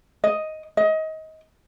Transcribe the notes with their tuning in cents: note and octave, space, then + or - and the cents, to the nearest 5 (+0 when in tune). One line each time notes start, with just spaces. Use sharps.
D#5 +5
D#5 +25